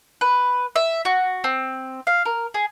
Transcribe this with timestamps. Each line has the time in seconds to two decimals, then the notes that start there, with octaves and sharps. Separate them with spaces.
0.21 B4
0.76 E5
1.05 F#4
1.44 C4
2.07 F5
2.25 A#4
2.54 G#4